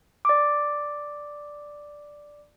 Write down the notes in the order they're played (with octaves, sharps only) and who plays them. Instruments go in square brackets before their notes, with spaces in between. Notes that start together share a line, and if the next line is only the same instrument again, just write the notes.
[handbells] D5 D6